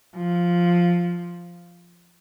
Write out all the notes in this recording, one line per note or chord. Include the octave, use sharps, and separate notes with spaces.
F3